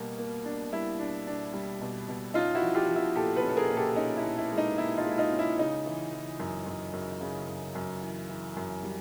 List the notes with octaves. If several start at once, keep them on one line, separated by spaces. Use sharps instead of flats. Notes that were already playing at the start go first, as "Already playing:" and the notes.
Already playing: B2 G3 A#3
A#3
D4
G3 E4
D4
D4
G3
B2
B2
C#4 D#4 F4
E4 F#4
F3
F4 G4
F3
E4 F#4
A#2 G4 A4
A4 B4
C#4
A4
G#4 A#4
A#2
G4 A4
C#4 D#4
E4
A#2
E4
G#3
D#4
A#2 E4
D#4 F4
G#3
E4
D#4 F4
C#4
E4
C#3 D#4
E3
E3
F#2
F#2
F#2
C#3
F#2
F#2
E3
E3
F#2
G3